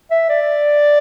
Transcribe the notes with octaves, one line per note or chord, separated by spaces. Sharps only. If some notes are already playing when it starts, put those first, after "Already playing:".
E5
D5